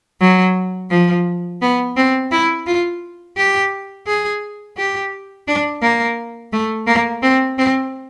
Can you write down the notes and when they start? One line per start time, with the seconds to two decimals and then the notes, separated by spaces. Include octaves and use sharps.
0.21 F#3
0.91 F3
1.62 B3
1.97 C4
2.31 E4
2.67 F4
3.37 G4
4.07 G#4
4.77 G4
5.48 D4
5.82 A#3
6.53 A3
6.87 A#3
7.23 C4
7.58 C4